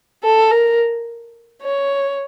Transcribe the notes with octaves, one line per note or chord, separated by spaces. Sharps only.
A4
A#4
C#5